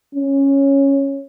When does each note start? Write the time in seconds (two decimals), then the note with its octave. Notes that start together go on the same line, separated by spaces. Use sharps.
0.15 C#4